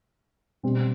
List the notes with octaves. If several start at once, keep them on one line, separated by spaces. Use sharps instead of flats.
B2 G3 C4 G4